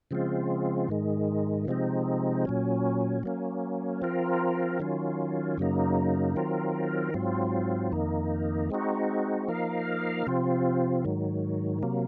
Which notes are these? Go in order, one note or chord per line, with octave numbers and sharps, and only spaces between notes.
C#3 F3 G#3 C4 F4
G#2 D#3 G#3
C3 F3 G#3 C4 D#4
A#2 F#3 C#4
F#3 A#3 C#4
F3 C4 F4 A#4
D#3 F#3 C#4 F4
F#2 C#3 F#3 A#3 D#4
D#3 F#3 C4 F4 A#4
G#2 F#3 C4 F4
F2 D#3 A#3 D#4
G#3 C4 D#4 F#4
F3 A#3 D#4 A#4 F5
C3 F3 C4 F4
G#2 D#3 F#3
C3 F#3 A#3